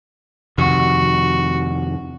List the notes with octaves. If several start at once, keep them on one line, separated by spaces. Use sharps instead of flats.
F2 C3 D#3 F#4